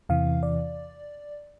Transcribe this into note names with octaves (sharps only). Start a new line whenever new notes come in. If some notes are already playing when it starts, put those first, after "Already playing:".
E2 C3 E3 F5
D5